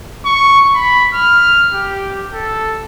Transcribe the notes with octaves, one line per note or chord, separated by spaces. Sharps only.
C#6
B5
F6
G4
A4